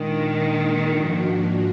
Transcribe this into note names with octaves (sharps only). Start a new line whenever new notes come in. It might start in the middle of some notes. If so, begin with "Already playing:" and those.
Already playing: A#2 D#3 G#3 D4
G#2 F3 A#3 D4 F#4